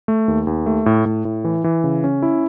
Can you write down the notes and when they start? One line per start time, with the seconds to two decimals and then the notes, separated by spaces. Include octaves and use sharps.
0.08 A3
0.28 D#2
0.47 D#2
0.66 A3
0.86 A2
1.06 A2
1.25 A2
1.44 E3
1.64 E3
1.84 C#3
2.04 C#4
2.23 E4